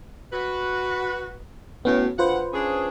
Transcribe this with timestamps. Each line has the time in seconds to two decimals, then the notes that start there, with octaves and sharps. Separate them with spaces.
0.31 F#4 B4
1.85 A2 B3 C#4 F#4
2.19 D2 F4 B4 C5 F#5
2.52 C#4 D4 G#4